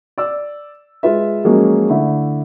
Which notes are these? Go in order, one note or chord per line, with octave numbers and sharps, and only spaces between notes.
D5 E6
G#3 F4 B4 E5
F3 F#3 G#3 A#3 C#4
D3 A3 E4